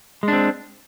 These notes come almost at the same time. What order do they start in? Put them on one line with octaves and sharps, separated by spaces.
G#3 D4 C4